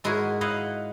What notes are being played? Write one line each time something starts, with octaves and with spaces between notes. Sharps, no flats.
G#2 G#3 E4 F#4 G#4 A#4
E4 D#5 F5 F#5